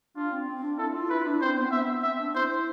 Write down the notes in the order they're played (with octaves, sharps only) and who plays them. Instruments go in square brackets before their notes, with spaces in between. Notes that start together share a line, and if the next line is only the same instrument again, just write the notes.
[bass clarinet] D4 [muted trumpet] F4
[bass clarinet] C4
C4
D4
[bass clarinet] E4 [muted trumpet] A4
[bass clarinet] F4
[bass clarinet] E4 [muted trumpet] B4
[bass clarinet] D4
[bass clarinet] C4 [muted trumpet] C5
[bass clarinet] B3
C4
[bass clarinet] B3 [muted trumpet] E5
[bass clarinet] C4 [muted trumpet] E5
[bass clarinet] D4
[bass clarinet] E4 [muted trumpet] C5